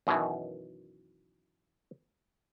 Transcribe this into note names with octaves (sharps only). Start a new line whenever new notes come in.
F#2 B2 D#3 E3